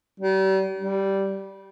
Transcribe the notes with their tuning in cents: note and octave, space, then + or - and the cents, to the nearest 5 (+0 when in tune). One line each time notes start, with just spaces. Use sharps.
G3 -40
G3 -10